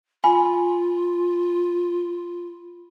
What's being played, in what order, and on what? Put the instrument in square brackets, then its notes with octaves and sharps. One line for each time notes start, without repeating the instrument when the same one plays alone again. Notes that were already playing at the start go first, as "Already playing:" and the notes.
[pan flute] F4 [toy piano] G#5 [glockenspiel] B5